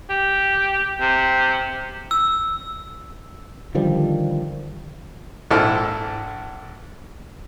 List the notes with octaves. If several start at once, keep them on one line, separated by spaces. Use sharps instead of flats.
G4
C3
E6
D3 D#3 F3 G3
A#1 G#2 E4 A4 F6